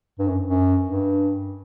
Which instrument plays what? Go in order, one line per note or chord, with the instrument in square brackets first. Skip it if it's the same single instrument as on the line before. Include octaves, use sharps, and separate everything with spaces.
[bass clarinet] G2
F#2
F#2
G2